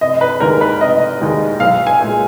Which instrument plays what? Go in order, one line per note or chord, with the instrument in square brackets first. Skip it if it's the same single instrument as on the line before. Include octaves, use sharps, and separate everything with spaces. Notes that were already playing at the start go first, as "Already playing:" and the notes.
[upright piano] F1 D#5
B4
D#2 D#3 G#3 A#4
B4
F1 D#5
D#2 D#3 G#3
B1 F5
G#5
A#2 G#3